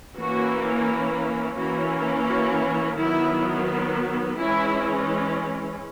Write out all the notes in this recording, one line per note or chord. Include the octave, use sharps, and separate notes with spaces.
E3 A#3 C#4 F#4
E3 A#3 C#4 F#4
F#4
D#3 F#3 B3 E4
E3 G#3 C#4 E4